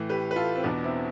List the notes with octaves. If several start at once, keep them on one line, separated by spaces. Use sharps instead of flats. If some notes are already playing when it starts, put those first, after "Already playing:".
Already playing: A2 E3
G4 B4
B4
F4 A4
C4
E2 B2 B3 D4
C4 E4